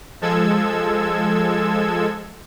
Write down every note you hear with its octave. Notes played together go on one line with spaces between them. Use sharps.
F3 G#3 A4 E6 G#6